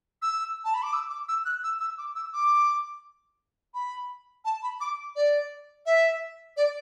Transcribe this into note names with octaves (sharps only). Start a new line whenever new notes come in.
E6
A5
B5
D6
E6
D6
E6
F#6
E6
E6
D6
E6
D6
B5
A5
B5
D6
D5
E5
D5